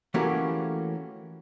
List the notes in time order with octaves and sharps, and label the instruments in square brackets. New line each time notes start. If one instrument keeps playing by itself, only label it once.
[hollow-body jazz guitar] E3 A3 A#3 C#4 F#4 G4